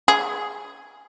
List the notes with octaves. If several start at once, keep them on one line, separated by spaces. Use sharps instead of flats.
G#4